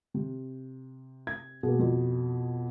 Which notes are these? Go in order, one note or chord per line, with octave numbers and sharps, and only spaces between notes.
C3
G#6
B2 A#3 G#4
F2